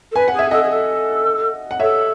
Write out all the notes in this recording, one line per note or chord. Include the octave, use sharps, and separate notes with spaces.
A4
B4 G#5
F#5
G#4
E5
A4 D#5 F#5
G#4
A4
F#5
A4 C#5 E5